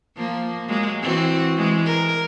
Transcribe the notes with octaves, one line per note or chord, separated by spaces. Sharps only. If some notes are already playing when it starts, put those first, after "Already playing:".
F3 A#3
F#3 G#3 A#3
E3 C4 F#4
E3 G#3
A#4